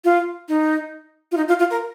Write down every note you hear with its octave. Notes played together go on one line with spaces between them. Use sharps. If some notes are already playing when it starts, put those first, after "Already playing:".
F4
D#4
F4
D#4
F4
F4
A#4